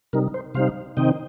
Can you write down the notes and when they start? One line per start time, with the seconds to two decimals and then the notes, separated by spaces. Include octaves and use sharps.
0.13 C3 G3 D#4 A#4
0.34 C5
0.55 C3 G3 D#4 C5 F5
0.97 C3 D#3 C4 D#4 D#5 G5